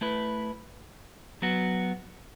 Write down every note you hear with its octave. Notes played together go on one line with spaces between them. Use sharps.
A3 E4 B4
F#3 B3 F#4